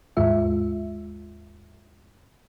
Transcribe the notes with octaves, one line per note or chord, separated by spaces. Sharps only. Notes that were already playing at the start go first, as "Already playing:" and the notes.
D#2 G#2 G#3 F4 E5